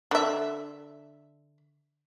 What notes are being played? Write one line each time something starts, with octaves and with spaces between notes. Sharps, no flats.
D3 E5